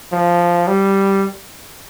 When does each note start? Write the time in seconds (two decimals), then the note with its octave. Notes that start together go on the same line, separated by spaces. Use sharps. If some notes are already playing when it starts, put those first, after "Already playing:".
0.13 F3
0.67 G3